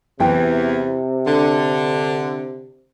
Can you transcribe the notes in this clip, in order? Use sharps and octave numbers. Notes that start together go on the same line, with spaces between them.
E2 C3 E3 G5
D3